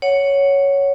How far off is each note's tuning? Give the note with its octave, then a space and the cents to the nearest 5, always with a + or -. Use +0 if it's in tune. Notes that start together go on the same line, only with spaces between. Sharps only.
C#5 +5 F#5 +0